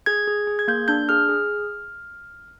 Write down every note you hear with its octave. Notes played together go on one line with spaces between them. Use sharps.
G#4 G#6
G#4
G#4
G#6
A#3 G6
D4 G6
G#4 F6
G#4